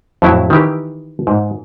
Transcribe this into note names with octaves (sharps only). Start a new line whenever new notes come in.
F2 A2 F#3 E4
D#3 E3 G4
G#2